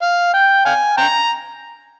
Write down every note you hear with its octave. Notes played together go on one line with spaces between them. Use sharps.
F5
G5
F5 G#5
G5 A#5